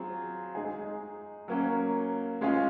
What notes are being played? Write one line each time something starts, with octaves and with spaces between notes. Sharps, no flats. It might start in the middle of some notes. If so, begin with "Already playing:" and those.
Already playing: F#3 C4 F4 G#4
G#3 D#4 G#4
F#3 A#3 C#4
G#3 C#4 F4 G#4